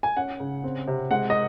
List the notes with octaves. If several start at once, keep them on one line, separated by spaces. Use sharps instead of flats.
G#5
C#4 F#5
C#3
C4
C3
G#3 F#5
D#5